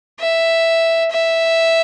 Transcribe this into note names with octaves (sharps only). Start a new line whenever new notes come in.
E5
E5